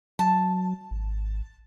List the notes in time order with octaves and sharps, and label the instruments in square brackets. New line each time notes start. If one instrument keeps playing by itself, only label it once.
[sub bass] F#3 [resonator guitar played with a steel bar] A5
[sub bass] G#1